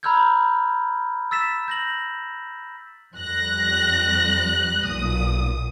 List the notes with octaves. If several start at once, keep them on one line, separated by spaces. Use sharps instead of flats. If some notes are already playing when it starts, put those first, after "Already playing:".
A#5 B5 E6 F6 G6 G#6
E6 A6 B6 E7
G6 A#6 F#7
F2 G3 F#6 A#6
B1 A#2 D#6